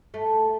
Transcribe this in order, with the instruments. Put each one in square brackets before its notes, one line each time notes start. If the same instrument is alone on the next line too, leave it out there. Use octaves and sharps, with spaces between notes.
[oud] A3